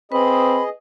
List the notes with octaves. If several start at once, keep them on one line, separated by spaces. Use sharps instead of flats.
C4 G#4 B4 D#5 B5